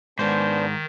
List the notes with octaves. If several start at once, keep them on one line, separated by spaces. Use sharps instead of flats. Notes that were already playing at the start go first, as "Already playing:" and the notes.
G#2 D#3 B3 D4 C5